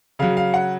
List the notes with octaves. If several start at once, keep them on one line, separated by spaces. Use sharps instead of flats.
C#3 F#3 F5
F5
F#5